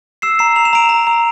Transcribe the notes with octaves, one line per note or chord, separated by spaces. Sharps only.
E6 C7 E7
A#5 C7 E7
A#5 F7
E7
A#5 D7 F7
A#5
A#5